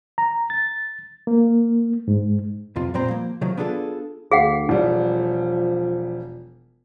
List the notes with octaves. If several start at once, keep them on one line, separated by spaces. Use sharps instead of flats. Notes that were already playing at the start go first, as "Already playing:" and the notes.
A#5
A6
A#3
G#2
B1 F2 C3 F4
F2 A#2 G3 C4 C5 A#5
F3 A#3
C3 D#3 F3 F#3
B3 D4 F4 G#4 A4
D2 G#4 F5 F#5
E1 F3 G3